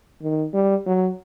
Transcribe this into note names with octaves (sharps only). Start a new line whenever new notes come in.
D#3
G3
F#3